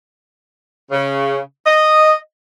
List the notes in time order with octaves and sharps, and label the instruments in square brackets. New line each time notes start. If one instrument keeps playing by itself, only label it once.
[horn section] C#3
D#5